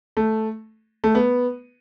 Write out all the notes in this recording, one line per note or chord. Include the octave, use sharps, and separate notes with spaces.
A3
A3
B3